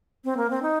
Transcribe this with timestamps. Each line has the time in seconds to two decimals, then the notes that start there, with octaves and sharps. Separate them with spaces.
0.24 C4
0.37 A#3
0.50 C4
0.62 D#4